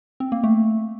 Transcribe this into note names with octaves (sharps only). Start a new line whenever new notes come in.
C4
A#3
A3